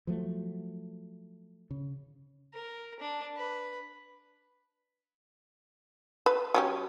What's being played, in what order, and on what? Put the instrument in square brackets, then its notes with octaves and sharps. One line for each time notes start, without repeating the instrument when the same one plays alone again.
[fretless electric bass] F3 F#3 A3
C#3
[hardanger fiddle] A#4
D4
B4
[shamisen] B4
F#3 C#4 G4